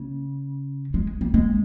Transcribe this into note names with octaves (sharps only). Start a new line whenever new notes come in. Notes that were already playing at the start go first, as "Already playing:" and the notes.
Already playing: C#3
G#3
A#3
G#3